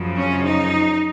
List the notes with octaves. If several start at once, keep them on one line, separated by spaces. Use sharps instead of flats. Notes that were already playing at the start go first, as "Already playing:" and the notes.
Already playing: F#2 C#3 F3
C#4
D#4